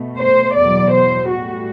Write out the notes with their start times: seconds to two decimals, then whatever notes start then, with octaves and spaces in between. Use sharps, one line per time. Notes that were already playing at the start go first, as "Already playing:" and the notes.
Already playing: B2 A3
0.18 C5
0.55 E2 B2 F#3 D5
0.92 C5
1.29 A2 G3 F#4